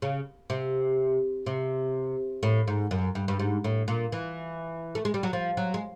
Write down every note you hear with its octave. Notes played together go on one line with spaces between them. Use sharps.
C#3
C3
C3
A2
G#2
F#2
G2
G2
G#2
A2
A#2
E3
A3
G#3
G3
F#3
F3
F#3
G#3